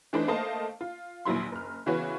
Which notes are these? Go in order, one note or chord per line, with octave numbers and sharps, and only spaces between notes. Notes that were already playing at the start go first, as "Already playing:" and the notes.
E3 A3 D4 D#4 B4 C5
A3 A#3 C5 D#5 F5 A5
F4
A#1 D#2 F#3 E4 C6
F#1 F6
C#3 E3 B3 F#4 B4 C#5